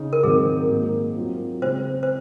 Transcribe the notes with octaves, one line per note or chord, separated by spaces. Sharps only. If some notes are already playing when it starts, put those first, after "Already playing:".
Already playing: C#3 D#4
A#4
G#2 D#3 F#3 C4 D#4 G#4
G#2 D#3 A#3 D#4
F#3 C4 F4
C#3 G#3 C4 C5
C5